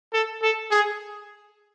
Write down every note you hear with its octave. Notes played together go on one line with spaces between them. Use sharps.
A4
A4
G#4